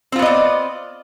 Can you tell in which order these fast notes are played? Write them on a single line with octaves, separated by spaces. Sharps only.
C4 F4 B3 D#5 D5